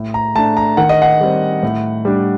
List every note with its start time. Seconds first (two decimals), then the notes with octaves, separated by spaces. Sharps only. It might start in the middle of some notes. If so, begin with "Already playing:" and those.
Already playing: A2
0.14 A#5
0.35 A3 A5
0.38 D4
0.57 A#5
0.77 D#3 F#5
0.89 D#5
1.02 F#5
1.21 G3 C4
1.63 A2
2.05 G3 D4